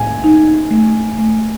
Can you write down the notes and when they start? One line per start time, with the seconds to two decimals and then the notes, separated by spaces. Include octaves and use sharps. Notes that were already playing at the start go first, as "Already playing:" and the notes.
Already playing: A2 G#5
0.24 D#4
0.71 A3
1.18 A3